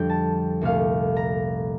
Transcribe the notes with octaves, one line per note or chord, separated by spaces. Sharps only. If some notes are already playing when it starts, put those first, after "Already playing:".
Already playing: F2 D3 G3 G5
A5
C2 A#2 A3 F5
A#5